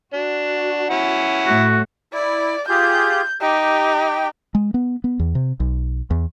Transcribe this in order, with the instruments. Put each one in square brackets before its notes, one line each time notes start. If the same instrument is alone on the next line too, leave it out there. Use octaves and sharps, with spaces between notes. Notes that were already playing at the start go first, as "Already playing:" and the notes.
[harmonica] D4 [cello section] F#4
[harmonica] C#4 E4 F#5
[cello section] A2 A3 [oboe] F#4
[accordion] E4 [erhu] D5
[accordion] F4 G4 G#4 [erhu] G6
[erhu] D#4 [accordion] G4 G5
[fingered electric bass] G#3
B3
B3
E2
C3
B1
E2